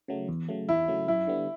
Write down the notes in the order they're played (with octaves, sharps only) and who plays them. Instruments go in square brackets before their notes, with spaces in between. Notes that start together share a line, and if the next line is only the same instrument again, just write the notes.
[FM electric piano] C#3 F#3 A3
E2
C#3 F#3 A3
[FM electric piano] E2 [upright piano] E4
[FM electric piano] C#3 F#3 A3
[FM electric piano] F#2 [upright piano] E4
[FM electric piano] D3 G3 B3